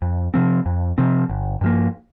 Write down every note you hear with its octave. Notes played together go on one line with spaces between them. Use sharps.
F2
C3 F3 C4
F2
C3 F3 C4
G1
G2 F3 A#3